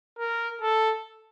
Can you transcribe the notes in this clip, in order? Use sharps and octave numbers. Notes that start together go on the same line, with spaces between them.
A#4
A4